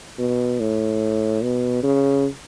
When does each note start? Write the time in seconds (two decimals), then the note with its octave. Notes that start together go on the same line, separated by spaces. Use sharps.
0.19 B2
0.60 A2
1.42 B2
1.83 C#3